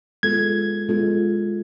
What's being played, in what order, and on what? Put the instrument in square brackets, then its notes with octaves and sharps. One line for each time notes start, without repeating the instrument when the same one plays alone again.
[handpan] G#3 B3 F4 A4 [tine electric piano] G#6
[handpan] G#3 B3 F4 A4